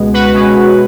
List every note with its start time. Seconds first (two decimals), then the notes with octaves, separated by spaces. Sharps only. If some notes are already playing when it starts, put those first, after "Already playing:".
Already playing: C#2 B2 G#3 B3
0.14 F#4 B4
0.33 B2 G#3 C#4